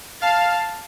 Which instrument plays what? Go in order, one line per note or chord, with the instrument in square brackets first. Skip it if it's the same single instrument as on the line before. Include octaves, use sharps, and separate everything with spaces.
[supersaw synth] F5 [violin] A5